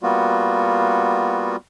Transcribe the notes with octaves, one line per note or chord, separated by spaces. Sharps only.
G3 A#3 B3 F4 F#4